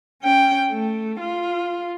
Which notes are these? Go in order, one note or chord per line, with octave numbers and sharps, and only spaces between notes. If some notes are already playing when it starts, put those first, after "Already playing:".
C#4 G5
A3
F4